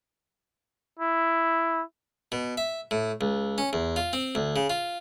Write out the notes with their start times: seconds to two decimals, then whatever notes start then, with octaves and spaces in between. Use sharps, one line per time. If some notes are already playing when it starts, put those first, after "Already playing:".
0.99 E4
2.32 B2
2.57 E5
2.91 A2
3.21 C#2
3.58 C#4
3.73 E2
3.96 F4
4.13 C4
4.35 D2
4.56 C#3
4.70 F4